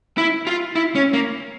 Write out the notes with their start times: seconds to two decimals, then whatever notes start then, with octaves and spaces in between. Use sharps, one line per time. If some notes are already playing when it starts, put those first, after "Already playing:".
0.18 E4
0.47 F4
0.75 E4
0.95 C#4
1.13 A#3